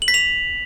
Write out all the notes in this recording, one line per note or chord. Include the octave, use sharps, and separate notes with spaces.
F#7
B6
F7